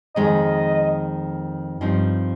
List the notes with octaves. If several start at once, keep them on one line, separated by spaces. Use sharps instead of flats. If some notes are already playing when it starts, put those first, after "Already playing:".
F2 D#3 G#3 D#5
G2 F3 C4 D#4